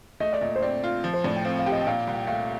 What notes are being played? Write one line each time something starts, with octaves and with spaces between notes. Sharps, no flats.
A3 D#5
D5
A#2 D#5
C5
C4 D5
F4
F3
C5
A2 D5
G5
C4 F5
F5
G4
D#5
G5
A#2 F5
C2
A3 F5